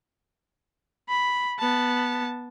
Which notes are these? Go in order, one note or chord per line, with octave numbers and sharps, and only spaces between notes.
B5
B3 A5